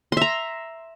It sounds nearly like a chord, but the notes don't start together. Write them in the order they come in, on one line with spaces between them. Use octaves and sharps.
C6 E5 A#5